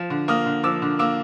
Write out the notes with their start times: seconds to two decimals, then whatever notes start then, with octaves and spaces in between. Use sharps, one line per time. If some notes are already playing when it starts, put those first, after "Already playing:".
Already playing: F3
0.10 D3
0.28 A#3 D#6 F6
0.46 D3
0.63 F3 D6 E6
0.82 D3
0.99 A#3 D6 E6